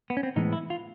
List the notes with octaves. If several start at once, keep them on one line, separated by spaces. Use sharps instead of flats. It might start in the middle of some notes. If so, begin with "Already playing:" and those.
B3
C#4
C4
A2 E3 G#3 B3 D#4
E4
F4